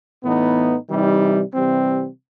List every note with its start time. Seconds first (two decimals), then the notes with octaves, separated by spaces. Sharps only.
0.22 A2 E3 B3 D#4
0.89 C3 E3 G3 D#4
1.54 C3 E3 G3 C4